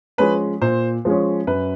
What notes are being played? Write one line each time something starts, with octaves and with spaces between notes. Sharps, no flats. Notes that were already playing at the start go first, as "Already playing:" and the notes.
F3 G#3 C#4 B4
A#2 C5
F3 G#3 C#4
F#2 B4